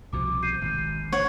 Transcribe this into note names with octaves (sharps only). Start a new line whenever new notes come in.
C2 B2 F3 D6
G6 C7 D#7
G#1
C#5 F#5